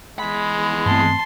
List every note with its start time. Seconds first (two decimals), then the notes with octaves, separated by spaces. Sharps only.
0.19 E2 G#3 B5
0.86 G2 A3 C4 A5 C6